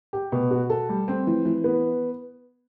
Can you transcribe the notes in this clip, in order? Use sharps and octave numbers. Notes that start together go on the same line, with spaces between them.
G4
B2
F#4
A4
G3
C4
E3
E3
B3